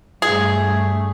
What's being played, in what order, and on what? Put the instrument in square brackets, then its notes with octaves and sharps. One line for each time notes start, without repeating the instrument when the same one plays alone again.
[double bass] G2 A3 [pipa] G#4